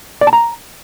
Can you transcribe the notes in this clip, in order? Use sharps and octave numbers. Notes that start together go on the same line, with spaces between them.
D5
A5
A#5